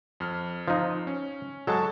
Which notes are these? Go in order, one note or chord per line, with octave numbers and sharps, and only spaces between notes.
F2 F6
F3 D#4
C#4
F#3 G#3 A4 A5 C#6